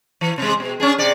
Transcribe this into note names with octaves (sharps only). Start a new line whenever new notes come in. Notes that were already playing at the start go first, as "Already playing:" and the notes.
E3
C3 G#3
B2
C#4 D4 G#4
C3 D5